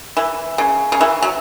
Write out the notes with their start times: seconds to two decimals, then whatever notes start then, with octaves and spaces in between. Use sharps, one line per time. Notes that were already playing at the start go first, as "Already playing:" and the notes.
0.17 E3
0.58 C#3
0.92 C#3
1.01 E3
1.23 F#3